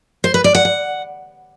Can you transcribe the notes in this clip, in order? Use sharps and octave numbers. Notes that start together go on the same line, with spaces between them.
C5
B4
D5
F#5
F#5